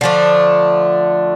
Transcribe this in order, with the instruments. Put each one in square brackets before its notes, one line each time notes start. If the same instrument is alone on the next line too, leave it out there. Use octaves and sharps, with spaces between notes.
[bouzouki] D3 F3 A3 D4